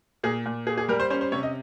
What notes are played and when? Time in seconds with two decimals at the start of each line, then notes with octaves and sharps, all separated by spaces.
0.23 A#2 G#4
0.46 A#2
0.67 A#3 G#4
0.77 G#4
0.89 G3 A#4
1.00 C5
1.10 C#4 C5
1.21 C5
1.32 C3 C#5
1.43 D#5